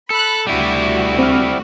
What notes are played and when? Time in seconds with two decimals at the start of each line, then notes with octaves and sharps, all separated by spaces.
0.10 A4 B5 F#6
0.47 D2 G3 E4 F#4
1.19 C4 F6